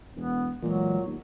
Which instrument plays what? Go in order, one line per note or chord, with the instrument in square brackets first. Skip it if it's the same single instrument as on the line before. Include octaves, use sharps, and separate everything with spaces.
[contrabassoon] E1 [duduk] B3
[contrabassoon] A#2 [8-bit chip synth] E3 G#3 [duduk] F#3
[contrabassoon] D#2